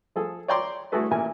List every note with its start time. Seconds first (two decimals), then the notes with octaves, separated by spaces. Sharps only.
0.16 F3 G#4 A4
0.48 C#5 D5 G5 A#5 C6 D6
0.92 A3 E4 F#4 G#4 A4 B4
1.11 A1 A#2 G#5